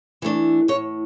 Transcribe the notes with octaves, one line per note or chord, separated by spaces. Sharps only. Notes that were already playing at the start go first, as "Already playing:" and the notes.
E3 A3 D4
A2 C#5